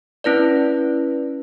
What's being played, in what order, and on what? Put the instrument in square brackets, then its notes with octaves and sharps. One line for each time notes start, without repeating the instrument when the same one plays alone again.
[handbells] C#4 E4 B4 D5